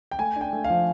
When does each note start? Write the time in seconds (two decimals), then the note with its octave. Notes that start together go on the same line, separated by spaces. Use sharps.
0.11 G5
0.18 A3 G#5
0.36 D4
0.41 G5
0.53 A3
0.64 F5
0.70 F3